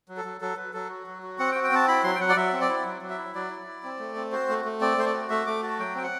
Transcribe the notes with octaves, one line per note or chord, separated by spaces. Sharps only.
F#3
A4
F#3
F#3 A4
F#3 B4
F#3 A4
F#4
F#3
F#4
C4 F#5
G5
F#4
G5
C4 A5
E4 B5
F#3 C6
G5
F#3 F#5
D5
F#3 E5
C4
D5
E4
F#3
F#3
E5
E4
F#3 D5
E4
E4
C4
A3
C4
F#4 C5
A3
A3
C4 D5
A3 C5
D5
F#4
A3 E5
A3 D6
F#4 A5
F#3 G5
C4 G5
F#5